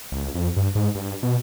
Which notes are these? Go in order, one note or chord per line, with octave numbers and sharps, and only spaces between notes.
C#2
F2
G2
G#2
G2
B2